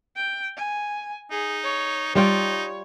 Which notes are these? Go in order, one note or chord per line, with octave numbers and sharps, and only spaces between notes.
G5
G#5
D#4 G#4
C#5
G3 D#4 F4 C#5 G5